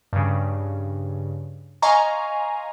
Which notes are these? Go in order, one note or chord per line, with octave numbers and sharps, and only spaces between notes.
G2 C#3
D#5 F5 G#5 A#5 C6 C#6